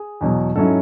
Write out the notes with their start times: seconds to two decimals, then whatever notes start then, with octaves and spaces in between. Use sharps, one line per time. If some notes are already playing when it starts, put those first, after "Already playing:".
Already playing: G#4
0.21 E2 B2 F#3
0.56 G#2 F#3 C#4 E4 A4